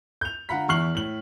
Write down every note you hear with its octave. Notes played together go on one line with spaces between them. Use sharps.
G6 F7
D3 F4 F#5 A#5 B5 B6
E2 E4 C#6 F6 C7 F#7
A2 F#7